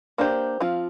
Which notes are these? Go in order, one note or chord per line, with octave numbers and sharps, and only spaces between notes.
A#3 D4 G4 C5
F3 C4 F4